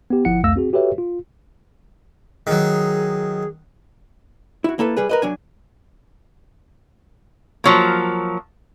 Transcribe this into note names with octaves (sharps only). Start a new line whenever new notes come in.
B3 G4
G1 F3 E4 F#5 C#7
C2 F2 A3 F5 E6 A#6
C4 F#4 G#4
F#4 G4 A4 B4 C#5 E5
F4
D#3 F#3 G#4
E4 F#4
A#3 E4 A4 B4
G3 G#4 B4
A#4 B4 D#5
F#3 D4 G#5
F3 F#3 A#3